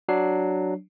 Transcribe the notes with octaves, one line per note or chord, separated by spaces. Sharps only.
F#3 D4 C7